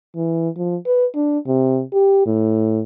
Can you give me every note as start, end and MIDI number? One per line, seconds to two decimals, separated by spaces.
0.16 0.49 52
0.57 0.76 53
0.86 1.06 71
1.15 1.38 62
1.47 1.82 48
1.93 2.21 67
2.26 2.82 45